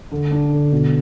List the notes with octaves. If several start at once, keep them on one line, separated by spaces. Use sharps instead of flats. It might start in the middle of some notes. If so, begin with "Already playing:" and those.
D3
D4
D3
B2